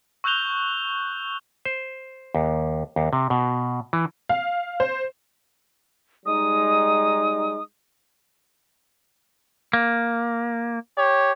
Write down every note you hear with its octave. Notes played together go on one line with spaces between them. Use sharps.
C#6 E6 F#6 G6 F7 G7
C5
D#2
D#2
C3
B2
E3
F5
C5
G3 G#3 D#4 D#6
A#3
G4 C#5